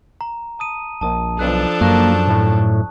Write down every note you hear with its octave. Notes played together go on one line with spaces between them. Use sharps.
A#5
A5 D#6 D#7
A#1 A5 D#6
B1 F3 D4 A4 F#6
F#2 A#3 A5 C#6 F#6
A2